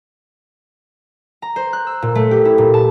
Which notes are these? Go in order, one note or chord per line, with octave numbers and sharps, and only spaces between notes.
A#5
C5
F#6
E6
A#2
A3
G4
E4
A#2
A5